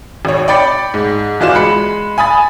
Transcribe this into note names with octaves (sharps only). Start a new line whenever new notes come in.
G#1 C#5
D5 G5 B5 A6 C#7
G#2
G1 E3 F4 F#4 D5 E7
G#3 B5 C#7
G#5 B5 D#6 A6